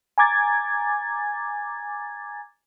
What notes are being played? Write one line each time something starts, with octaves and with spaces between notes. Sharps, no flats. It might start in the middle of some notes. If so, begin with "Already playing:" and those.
G#5 A#5 D6 G#6 A6